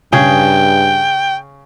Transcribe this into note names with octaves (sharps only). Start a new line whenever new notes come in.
G2 C#3 G#4 G5